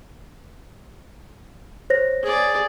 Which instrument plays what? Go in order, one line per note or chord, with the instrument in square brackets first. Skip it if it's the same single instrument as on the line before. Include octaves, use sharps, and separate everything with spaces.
[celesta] C5 C#5 A#6
[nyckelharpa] G#4 D5